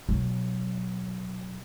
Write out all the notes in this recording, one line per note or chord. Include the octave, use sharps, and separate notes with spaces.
B2 F#3